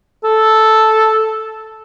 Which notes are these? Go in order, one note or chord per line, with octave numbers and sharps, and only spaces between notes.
A4